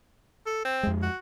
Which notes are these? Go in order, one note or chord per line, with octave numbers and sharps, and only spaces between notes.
A4
C4
F2 G#3
F#4